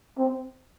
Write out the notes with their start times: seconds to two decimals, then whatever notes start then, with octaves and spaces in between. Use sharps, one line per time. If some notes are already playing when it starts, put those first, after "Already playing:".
0.18 C4